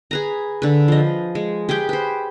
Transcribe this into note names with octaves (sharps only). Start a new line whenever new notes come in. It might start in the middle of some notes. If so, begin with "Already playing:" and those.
G#4 B4 A#5
D3 B4
F3 D#5
G#3
G4 G#4 B4 G5
B4 C5